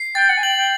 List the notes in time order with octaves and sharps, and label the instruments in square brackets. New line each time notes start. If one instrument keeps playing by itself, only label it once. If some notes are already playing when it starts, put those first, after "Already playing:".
Already playing: [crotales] C7
[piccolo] G5 [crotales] A6
[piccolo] F#5
G#5
[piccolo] G5 [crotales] F#7
[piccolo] G5